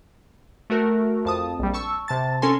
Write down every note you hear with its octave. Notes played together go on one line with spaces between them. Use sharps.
A3 F#4 A#4
F2 A5 D#6
A#1 G3
A5 C#6 E6
C3 A5 A6
C#4 A4 A#4 G#5 C6